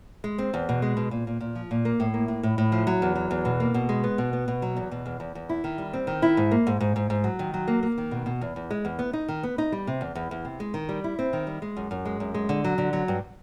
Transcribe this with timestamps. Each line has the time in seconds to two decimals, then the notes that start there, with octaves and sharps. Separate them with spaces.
0.24 G#3
0.38 C4
0.54 E2
0.69 B2
0.82 G#3
0.97 B2
1.11 A#2
1.27 A#2
1.40 A#2
1.55 F3
1.71 A#2
1.85 A#3
2.00 A2
2.14 A#3
2.28 A2
2.43 A2
2.58 A2
2.72 F3
2.87 F#3
3.02 E2
3.15 F#3
3.31 E2
3.45 B2
3.60 A#3
3.74 B2
3.89 G#3
4.04 B3
4.18 B2
4.33 B3
4.48 B2
4.62 F#3
4.77 E2
4.91 B2
5.06 E2
5.20 E2
5.35 E2
5.49 E4
5.64 D#3
5.78 G3
5.93 C4
6.07 D#3
6.22 E4
6.37 G#2
6.51 A#3
6.67 G#2
6.80 G#2
6.96 G#2
7.10 G#2
7.24 F#3
7.39 D#3
7.54 F#3
7.67 A#3
7.83 A#3
7.98 D#3
8.11 B2
8.26 B2
8.41 E2
8.56 E2
8.71 G#3
8.85 E2
8.99 B3
9.13 D#4
9.28 D#3
9.43 B3
9.58 D#4
9.72 G3
9.87 C3
10.01 E2
10.15 E2
10.31 E2
10.45 C3
10.60 G#3
10.74 D#3
10.89 G3
11.04 E4
11.19 C4
11.33 D#3
11.47 G3
11.62 G#3
11.77 F#2
11.91 F#2
12.05 G#3
12.20 F#2
12.34 G#3
12.49 D3
12.64 F#3
12.78 D3
12.93 F#3
13.08 G2